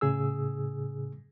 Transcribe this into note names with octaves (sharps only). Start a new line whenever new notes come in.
A2 C#3 G#4 E6